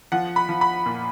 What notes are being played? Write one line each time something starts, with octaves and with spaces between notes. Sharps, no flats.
F3 F#5
B5
F3
B5
A#2